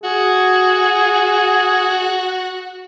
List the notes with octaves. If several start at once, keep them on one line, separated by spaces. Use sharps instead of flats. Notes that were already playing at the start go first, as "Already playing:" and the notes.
F#4 G#4